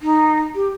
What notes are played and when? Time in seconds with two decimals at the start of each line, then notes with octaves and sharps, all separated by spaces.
0.01 D#4
0.54 G4